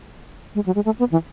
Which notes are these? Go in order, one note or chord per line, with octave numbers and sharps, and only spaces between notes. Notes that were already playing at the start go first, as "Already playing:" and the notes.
G#3
F#3
G#3
A3
B3
E3